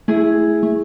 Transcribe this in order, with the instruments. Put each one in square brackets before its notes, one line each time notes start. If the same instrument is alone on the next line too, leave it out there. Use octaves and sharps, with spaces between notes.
[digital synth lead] A3 [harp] E4 G#4
[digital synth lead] A3